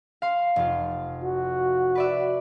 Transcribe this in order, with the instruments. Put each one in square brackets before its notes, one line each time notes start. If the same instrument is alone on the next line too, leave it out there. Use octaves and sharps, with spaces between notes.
[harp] F5 C6
F1 F4
[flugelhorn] F#4
[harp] B4 D5 E5